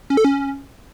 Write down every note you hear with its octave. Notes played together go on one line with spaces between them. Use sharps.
C#4
A4
C#4